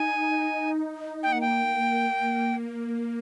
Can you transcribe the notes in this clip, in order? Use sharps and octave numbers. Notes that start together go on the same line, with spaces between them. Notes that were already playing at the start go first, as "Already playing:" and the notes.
Already playing: D#4 G#5
A#3 G5
F#5
G5